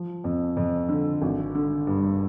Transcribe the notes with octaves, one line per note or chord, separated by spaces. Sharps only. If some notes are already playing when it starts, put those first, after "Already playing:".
Already playing: F3
F2
F2
D3
G#1
D3
G2